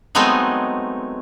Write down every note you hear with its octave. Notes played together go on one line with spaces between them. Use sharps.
F#3 G#3 A3 B3 C4 D#4